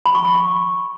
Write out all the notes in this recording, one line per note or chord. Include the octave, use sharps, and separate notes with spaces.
B5
C#6
C#6
C#6